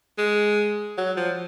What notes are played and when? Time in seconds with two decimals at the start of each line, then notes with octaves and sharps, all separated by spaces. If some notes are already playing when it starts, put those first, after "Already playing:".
0.18 G#3
0.98 F#3
1.17 F3